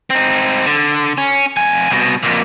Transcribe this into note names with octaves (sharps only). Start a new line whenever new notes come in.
C4 D#4
D3
C#4
F2 G#5
C2 B2
F2 A#2